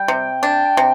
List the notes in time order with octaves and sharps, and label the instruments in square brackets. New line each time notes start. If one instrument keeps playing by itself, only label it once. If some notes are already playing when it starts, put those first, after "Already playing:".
Already playing: [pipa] G3 [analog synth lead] G5
[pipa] C3
D4
C3